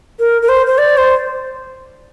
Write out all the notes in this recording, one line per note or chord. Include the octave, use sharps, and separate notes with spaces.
A#4
A#4
C5
C5
D5
C5